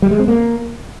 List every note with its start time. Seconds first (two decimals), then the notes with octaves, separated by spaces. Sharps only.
0.02 G3
0.11 G#3
0.19 C4
0.28 A#3